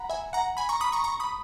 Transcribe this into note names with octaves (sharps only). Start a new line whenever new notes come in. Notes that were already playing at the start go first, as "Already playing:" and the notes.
Already playing: F#5 A#5 B5
E5 G#5
F#5 A#5
G#5 B5
A#5 C#6
B5 D#6
A#5 C#6
A#5 C#6
B5 D#6